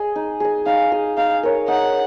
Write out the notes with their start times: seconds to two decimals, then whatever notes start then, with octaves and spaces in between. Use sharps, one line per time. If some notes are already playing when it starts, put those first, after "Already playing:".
Already playing: G#4 D#5
0.16 D#4
0.40 G#4 D#5
0.66 D#4 F5
0.92 G#4 D#5
1.17 D#4 F5
1.43 A#4 C#5
1.68 D#4 F#5